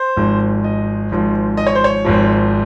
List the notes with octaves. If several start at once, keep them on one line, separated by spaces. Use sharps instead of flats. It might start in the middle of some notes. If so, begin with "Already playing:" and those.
Already playing: C5
G#1 G#2 F3
D#5
G#1 G#2 F3
D#5
C#5
C5
C#5
G#1 G#2 F3